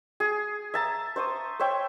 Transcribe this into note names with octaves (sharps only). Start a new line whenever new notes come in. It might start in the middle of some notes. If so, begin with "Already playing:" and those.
G#4
E5 A5 A#5
C5 E5 C#6 D#6
C5 C#5 E5 G5